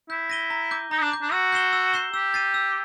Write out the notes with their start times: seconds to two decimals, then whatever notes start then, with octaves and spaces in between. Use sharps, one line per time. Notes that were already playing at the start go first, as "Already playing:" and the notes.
0.10 E4 G6
0.30 A#6 D#7 G7
0.50 A#5
0.71 D6 G6
0.91 D#4 A#5
1.01 D4
1.12 D6 G6
1.22 D4
1.32 F#4 E6
1.52 G6 C7 E7 G7
1.73 E6
1.93 G6 C7 E7 G7
2.13 G4 E6
2.34 A6 C7 D#7
2.54 E6